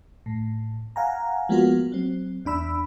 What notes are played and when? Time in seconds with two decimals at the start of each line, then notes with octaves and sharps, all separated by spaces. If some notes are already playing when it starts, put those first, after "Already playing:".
0.26 A2
0.96 F5 F#5 G#5 A#5
1.49 F3 G#3 A#3 B3 F4 F#4
1.92 F#3 C4
2.45 E2 D4 B5 E6